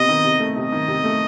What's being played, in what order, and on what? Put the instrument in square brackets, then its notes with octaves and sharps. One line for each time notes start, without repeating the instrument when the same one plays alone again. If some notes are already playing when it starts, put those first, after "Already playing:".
Already playing: [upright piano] C3 B3 [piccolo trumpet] D#5
[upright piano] D#3
C3
A3
[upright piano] C3 [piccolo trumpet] D#5
[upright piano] D#3
C3
A3